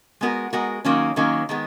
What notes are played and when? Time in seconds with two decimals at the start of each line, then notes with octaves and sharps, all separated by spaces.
0.21 G#3 B3 F#4 A#4
0.53 G#3 B3 F#4 A#4
0.85 D#3 F#3 A#3 C#4
1.16 D#3 F#3 A#3 C#4
1.49 D#3 G#3 B3